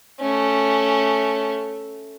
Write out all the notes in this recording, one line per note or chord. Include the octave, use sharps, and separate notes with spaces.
A3 C#4